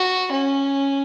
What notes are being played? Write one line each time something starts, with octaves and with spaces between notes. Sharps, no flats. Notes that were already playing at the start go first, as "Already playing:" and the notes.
Already playing: F#4
C#4